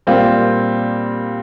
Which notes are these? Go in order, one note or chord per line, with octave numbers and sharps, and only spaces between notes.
A#2 G3 C4 F4